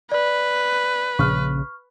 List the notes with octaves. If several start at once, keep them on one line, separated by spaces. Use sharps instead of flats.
B4 D5
A#1 C#3 C#6 F6